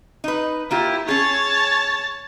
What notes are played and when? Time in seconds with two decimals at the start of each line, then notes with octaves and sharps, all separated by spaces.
0.24 D#4 B4
0.71 A#3 E4 F4 G4
1.08 C#4 G#4 C#5 A5